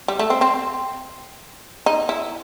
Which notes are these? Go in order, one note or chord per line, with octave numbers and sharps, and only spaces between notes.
G3
A3
C4
C4
D#4
E4